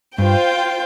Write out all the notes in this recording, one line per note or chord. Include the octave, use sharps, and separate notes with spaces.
G2 F4 C5 G5